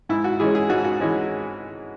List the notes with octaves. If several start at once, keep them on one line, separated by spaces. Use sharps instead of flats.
G#2 E4
F#4
E3 G#3 C#4 G#4
G#4
G#2 F#4
F#4
E3 G#3 C#4